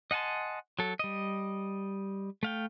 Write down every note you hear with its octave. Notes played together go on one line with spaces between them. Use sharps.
D#5 F#5 G#5 A5 C6
F#3 A4
G3 D#5
A3 F5 G5